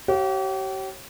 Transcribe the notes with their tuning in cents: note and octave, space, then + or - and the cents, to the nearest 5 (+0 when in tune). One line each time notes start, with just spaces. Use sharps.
G4 -40 C#5 -30 F5 +0